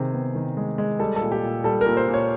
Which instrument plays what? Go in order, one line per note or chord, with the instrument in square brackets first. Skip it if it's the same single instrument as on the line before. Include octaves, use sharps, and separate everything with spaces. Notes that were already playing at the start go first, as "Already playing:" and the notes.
Already playing: [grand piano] C3 D#3 G#4
B3
D#3
G#3
G#3
G3 A4
A4
A#2
G4
A#2
G3 A4
A#2 A#4
C5
A#2
C#5